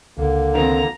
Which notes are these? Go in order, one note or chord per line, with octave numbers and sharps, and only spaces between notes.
C#2 D3 A#3
D#3 C4 A#5